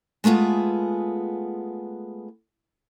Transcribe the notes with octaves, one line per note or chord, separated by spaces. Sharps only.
G#3 A3 B3 F4 G#4